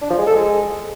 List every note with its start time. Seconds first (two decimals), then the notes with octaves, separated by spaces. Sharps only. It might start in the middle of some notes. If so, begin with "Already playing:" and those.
0.02 D4
0.10 F3
0.18 G#3
0.27 A4
0.35 G#3